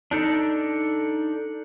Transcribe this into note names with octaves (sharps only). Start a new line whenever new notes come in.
D4 D#4 A4